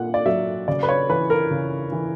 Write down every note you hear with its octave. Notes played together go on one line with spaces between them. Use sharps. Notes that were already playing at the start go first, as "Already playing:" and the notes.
Already playing: A#2 F#5
D5
F#3 E5
C#3 D5
B4
C#5
E3 B4
A#4
C#3
E3